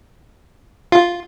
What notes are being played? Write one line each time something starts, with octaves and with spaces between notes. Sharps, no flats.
F4